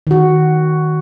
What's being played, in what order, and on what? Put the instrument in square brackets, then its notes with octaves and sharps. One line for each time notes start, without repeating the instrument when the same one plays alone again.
[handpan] D#3 F#4